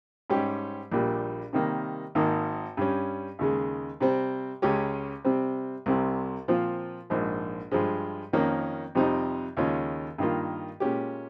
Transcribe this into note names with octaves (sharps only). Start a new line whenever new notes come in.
G#2 G3 C#4 G4
A#1 A#2 G3
C3 D#3 G3 A#3
G#1 G#2 D#3 A#3
G2 G3 C#4
D#2 C#3 G#3
C3 G3 C4
C#2 C#3 G#3 C#4 G4
C3 G3 C4
C2 C3 G3
A#2 F3 C4 F4
A#1 G#2 F3
G2 F3 G#3
F2 D#3 A#3 C#4
F2 C3 G3 C4 D#4
D#2 C#3 G#3 C#4 F4
G2 D#3 A#3 F4
A#2 G#3 C#4 G4